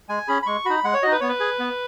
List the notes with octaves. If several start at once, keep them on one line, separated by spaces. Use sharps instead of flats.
G#3 G#5
C#4 G#4 B5
B5
G#3 C#6
D#4 F#4 B5
G#3 F#5
C#5
D#4 F#4 D#5
B4
B3 C#5
B4
G#4
B3